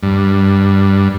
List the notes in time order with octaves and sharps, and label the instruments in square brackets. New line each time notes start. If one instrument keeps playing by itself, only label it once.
[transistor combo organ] G2